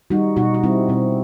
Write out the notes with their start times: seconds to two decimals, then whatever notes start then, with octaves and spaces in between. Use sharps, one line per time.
0.10 G3 D#4 F#4
0.36 B2 D#4 F#4
0.54 F#4
0.63 G3 C4 E4
0.89 B2 C4